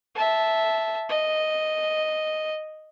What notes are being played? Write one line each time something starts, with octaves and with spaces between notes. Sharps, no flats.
E5 A5
D#5